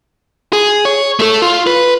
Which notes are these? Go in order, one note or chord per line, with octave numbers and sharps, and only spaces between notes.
G#4
C#5
A3 A4
F4
B4